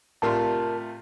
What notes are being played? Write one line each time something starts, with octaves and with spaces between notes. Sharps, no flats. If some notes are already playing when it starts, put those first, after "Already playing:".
A2 C3 A3 F4 A#4 D5 A5 C6